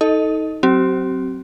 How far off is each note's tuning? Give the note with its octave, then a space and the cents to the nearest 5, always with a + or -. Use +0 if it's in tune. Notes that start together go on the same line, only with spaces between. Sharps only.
D#4 +25 A4 +0 D#5 +0
F#3 +0 C4 +0 G4 -45